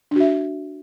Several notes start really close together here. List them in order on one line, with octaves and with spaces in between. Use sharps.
D4 F#4 E5